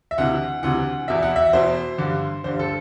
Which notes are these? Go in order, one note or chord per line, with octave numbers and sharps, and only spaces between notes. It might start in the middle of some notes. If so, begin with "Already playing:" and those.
E5
D2 C3 E3 F#5
D2 C3 E3 F#5
E2 B2 E5
F#5
E5
E2 B2 C5
G2 D3
G2 D3 C5
A4